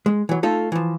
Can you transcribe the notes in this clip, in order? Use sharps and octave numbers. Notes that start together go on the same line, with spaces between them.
G#3
E3 F#3
A3 D#4 F4 A4
E3 F3